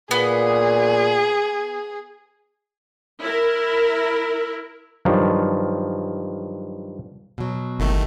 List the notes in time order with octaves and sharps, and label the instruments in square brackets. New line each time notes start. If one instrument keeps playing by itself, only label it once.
[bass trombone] A#2 [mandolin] B3 [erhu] G#4
[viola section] E4 A#4
[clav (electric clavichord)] G2 D#3 F3 F#3
[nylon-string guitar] B2 F#3
[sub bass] G1 [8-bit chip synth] C2 D#3 A3